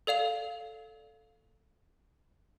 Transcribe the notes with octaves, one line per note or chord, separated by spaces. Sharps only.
A4 D5 F5 F7